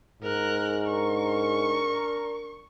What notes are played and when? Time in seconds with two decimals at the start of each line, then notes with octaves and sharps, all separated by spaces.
0.22 G#2 A#4 F#6
0.87 D4 A#4 C#6